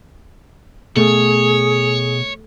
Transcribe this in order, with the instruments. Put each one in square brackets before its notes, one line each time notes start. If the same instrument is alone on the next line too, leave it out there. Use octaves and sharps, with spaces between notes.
[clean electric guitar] B2 [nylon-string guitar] A3 [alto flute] G#4 [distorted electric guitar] C#5